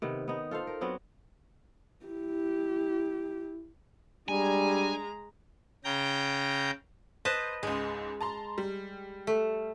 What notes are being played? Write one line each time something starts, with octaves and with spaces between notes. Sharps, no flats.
C3 D#3 B3
B3 D#4
F4 A4 C5 F5
A#4
F#3 B3 C4 D4
E4 G4
G3 G#3 D4 G#5 A#5
C#3 G5 A#5 G6
B4 C5 D#5 A5
C#2 G#2 G#3
A5 A#5 C6
G3
A3